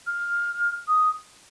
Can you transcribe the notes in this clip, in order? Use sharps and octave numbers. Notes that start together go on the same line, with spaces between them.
F6
D#6